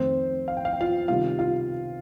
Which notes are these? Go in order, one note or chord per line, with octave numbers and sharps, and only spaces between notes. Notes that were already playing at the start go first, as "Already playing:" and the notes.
Already playing: F2 D#3 A3 C4 C5
F5
G5
F5
G5
F4 F5
C3 D#3 G3 F4 F5
F4 F5